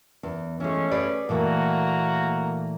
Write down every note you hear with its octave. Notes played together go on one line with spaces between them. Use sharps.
E2
E3 G#3 A3 C#4
G#4 B4 D5
A#2 E3 A3 A#3 F#4 A#5